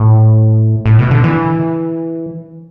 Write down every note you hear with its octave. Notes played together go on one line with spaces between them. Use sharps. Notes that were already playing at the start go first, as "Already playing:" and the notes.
Already playing: A2
A2
B2
D3
E3